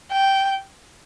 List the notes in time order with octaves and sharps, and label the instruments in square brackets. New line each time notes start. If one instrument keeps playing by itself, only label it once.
[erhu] G5